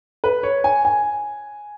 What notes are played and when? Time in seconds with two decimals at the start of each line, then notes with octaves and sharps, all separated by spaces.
0.24 B4
0.43 C#5
0.64 G#5
0.85 G#5